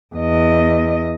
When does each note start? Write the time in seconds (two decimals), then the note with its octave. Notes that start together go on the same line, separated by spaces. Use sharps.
0.16 E2 D#5